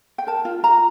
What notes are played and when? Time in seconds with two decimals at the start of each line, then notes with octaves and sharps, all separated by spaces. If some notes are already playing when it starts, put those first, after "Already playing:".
0.18 G5
0.27 A#4 A5
0.45 F4
0.63 F4 A#5